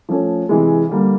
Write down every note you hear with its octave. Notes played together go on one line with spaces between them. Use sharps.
F3 A3 C#4
C3 E3 G#3
D3 G3 A#3